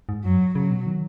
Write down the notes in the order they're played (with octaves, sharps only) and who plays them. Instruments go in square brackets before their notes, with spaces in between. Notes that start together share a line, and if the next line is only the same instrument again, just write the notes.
[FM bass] G#2
[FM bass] F#2 [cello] F#3
[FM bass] G#2
[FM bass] C#3 [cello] F#3
[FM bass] B2
D#3